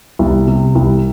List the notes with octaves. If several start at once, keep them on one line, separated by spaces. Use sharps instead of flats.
C2
C3
C2